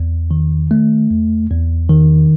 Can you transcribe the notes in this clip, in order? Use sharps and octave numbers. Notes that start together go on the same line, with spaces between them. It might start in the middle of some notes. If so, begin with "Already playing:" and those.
Already playing: E2
D#3
A3
E2
E2
D#3